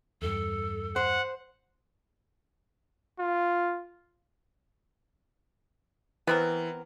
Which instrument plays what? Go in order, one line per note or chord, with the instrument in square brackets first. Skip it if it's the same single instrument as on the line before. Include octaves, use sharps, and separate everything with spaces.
[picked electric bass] E2 G2 [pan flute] A4
[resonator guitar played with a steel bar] C5 [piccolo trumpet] F#5
[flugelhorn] F4
[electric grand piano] E3 [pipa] B3 C4 A#4